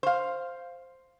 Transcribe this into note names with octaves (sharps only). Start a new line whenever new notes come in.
C5 F5